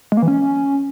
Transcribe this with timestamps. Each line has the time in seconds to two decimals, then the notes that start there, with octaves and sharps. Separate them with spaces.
0.12 G#3
0.17 A#3
0.22 E3
0.28 C#4